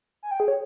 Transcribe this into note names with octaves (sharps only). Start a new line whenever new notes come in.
G#5
G5
G#4
C#5